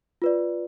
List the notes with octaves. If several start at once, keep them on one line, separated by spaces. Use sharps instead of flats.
F4 B4 D5